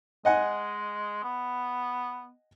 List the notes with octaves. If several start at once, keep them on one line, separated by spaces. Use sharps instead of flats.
G#3 D#5 F#5 G#5
B3